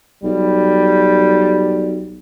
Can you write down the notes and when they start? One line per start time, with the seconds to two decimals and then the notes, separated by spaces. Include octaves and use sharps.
0.24 B1 G3